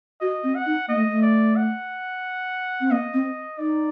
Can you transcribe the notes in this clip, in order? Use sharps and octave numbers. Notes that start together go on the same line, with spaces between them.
F#4 D#5
C4
F#5
D#4
A#3 D#5
A3
A3
D5
F#5
C4
A#3 D#5
C4
D#4 D5